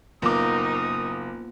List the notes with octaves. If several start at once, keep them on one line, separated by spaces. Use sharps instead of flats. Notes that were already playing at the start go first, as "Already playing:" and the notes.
F#1 A#3 B3 D#4 F4 A#4 D6 D#6